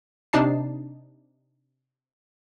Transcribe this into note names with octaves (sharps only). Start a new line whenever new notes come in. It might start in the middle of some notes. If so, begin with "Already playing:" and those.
C3 D4 D#4 A5 C7